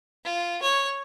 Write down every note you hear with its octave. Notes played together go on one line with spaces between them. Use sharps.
F4
C#5